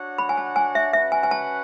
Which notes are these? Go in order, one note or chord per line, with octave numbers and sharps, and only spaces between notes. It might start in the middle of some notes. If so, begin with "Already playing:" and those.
Already playing: D4 F#4 C#5 F#5
B5
G#5
A5
G#5
E5
C#4 F#4 B4 E5 F#5
G#5
G#5
A5